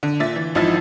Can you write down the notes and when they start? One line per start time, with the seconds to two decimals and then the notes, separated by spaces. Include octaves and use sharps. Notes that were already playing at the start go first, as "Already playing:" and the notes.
0.03 D3
0.20 A#2 E5 A6
0.36 E3
0.55 G#1 F3 D#4 E4 E6 A6